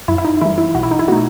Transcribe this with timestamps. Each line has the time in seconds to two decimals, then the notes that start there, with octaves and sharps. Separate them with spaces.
0.08 F#2 E4
0.18 E4
0.25 D#4
0.41 E3 G3 E4
0.58 E4
0.75 B1 F#4
0.83 E4
0.91 D#4
0.99 E4
1.08 B2 A3 D#4 F#4